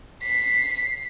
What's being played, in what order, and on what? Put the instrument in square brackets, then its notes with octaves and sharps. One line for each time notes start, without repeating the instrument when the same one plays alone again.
[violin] B6 C7